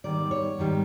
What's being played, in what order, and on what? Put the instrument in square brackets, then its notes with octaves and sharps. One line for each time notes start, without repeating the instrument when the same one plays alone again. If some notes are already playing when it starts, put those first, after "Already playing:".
[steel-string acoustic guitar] G#2 D#3 G3 B3 D5
C#5
G#2 D#3 G3 B3